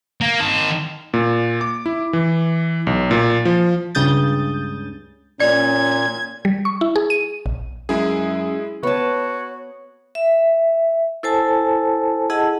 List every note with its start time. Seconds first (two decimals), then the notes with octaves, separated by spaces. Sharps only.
0.21 A#3
0.40 D#3 A5
1.14 A#2
1.61 D6
1.86 E4
2.13 E3
2.87 B1
3.11 A#2
3.45 F3
3.95 C#2 G2 C#3 D#6 G6 A6
5.40 A#2 C#4 D5 G#6
6.45 G3
6.65 C#6
6.81 E4
6.96 G#4
7.10 D#7
7.46 A#1
7.89 F#2 G#3 E4 G#4
8.83 B3 F#4 C#5 A5
10.15 E5
11.23 E4 A4 C5 G#5 A5
12.30 E4 G#4 D#5 F#5 A5